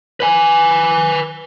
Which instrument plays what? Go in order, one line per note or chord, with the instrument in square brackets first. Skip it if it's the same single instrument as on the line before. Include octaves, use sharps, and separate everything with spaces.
[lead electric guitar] B4 G#5